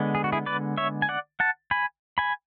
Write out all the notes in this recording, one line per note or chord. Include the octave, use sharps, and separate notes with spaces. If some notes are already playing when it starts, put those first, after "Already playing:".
Already playing: D3 G#3 B3
G#4
F#4
E4 G#4
B4 D5
C#5 E5
G#5
D5 F#5
F#5 A5
G#5 B5
G#5 B5